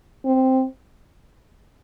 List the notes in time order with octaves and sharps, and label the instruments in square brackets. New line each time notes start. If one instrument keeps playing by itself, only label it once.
[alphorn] C4